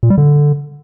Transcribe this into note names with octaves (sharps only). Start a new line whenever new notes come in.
A#2
G3
D3